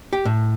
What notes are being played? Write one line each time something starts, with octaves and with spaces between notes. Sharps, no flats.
G4
A2